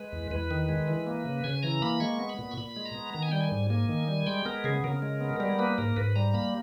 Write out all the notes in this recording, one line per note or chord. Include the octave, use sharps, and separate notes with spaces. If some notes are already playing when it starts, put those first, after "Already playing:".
Already playing: G#3 B4
E2
E2 B4
D#3
G#3
E3
A#3
C#3
C#3 G#5
E3 A#5
A#3 B5
G#3 C#6
B3
B5
A#2
C#6
A#2 B5
G#3
A#5
B3
D#3 A#5
G#5
G3 G5
G#5
G#2
A#3 G#5
D#3
G3
G#3 G5
B3 A#4
C#3 G#4
C#3 A#4
G#3
B3
G3 A#4
A#3 B4
G#2 A#4
G#2 B4
G3 A#5
A#3 B5